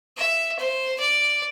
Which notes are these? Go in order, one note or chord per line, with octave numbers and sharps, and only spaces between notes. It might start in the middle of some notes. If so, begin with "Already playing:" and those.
E5
C5
D5